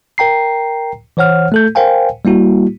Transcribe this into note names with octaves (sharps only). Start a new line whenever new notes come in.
A#4 G5 A#5 C7
E3 C5 C#5 F#5 F6
A3 A4 G6
A#4 C5 F5 G5 G#5
G3 A#3 E4 F#4